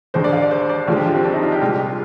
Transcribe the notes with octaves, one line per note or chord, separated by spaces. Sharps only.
D#2 D3 G#3 C5
D5
F5
D5
C5
D5
D#2 D3 F3 G#3 F4
G4
F4
C4
D4
D#4
F4
G4
C2 A#2 G#3 F4